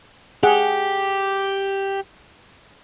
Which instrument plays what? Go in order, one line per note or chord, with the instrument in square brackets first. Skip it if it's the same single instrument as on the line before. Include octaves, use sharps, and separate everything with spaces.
[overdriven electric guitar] G4 [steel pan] G#4 F#5